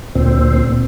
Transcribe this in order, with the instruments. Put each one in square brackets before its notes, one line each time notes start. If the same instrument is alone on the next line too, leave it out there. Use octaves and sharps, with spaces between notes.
[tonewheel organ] D2 A#2 C4